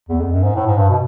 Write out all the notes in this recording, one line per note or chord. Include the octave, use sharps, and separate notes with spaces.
E2
F2
F#2
G#2
A2
G#2
G2
B2